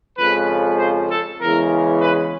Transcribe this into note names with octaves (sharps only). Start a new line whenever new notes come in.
F2 C#3 F3 G#3 B4
C5
A4
E2 C#3 E3 G#3 A#4
B4